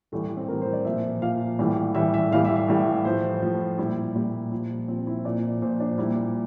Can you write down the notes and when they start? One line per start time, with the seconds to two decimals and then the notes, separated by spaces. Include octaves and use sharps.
0.12 A2 E3 G3 A3
0.37 C4
0.48 A2 E3 G3 A#4
0.61 C5
0.73 D5
0.85 A#2 F3 E5
1.22 A#2 F3 F5
1.59 A2 E3 G3
1.95 A2 E3 G3 E5
2.14 E5
2.31 A2 E3 G3 F5
2.45 E5
2.56 E5
2.68 A2 E3 G3
3.05 A2 F3 C5
3.42 A2 F3
3.78 A#2 G3 E4
4.15 A#2 G3
4.52 A#2 F3
4.88 A#2 F3 C4
5.07 E4
5.25 A#2 F3 D5
5.62 A#2 F3 C5
5.80 D4
5.98 A#2 G3 E4